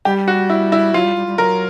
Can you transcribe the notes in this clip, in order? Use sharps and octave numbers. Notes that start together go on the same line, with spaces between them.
G3 G4
F#4
E4
E4
F#3 F4
G3
G3
G3
F#3 A#4